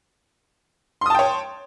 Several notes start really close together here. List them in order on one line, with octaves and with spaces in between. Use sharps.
C6 D#6 A5 G5 C#5